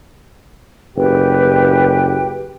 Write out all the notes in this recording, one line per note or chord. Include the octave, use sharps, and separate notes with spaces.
F#1 G4 B4 G5